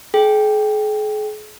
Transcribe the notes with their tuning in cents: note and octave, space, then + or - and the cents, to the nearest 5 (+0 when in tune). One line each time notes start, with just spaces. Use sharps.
G#4 +40 G5 +0